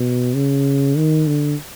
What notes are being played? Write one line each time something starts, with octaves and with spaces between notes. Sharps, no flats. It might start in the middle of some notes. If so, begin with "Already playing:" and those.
Already playing: B2
C#3
D#3
D3